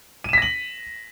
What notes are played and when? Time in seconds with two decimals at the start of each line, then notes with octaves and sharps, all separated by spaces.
0.24 D#7
0.29 E7
0.33 B6
0.38 A#6
0.42 F#7